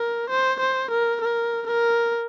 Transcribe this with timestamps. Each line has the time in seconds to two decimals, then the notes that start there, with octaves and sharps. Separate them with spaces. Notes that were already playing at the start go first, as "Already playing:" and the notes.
Already playing: A#4
0.30 C5
0.60 C5
0.91 A#4
1.21 A#4
1.67 A#4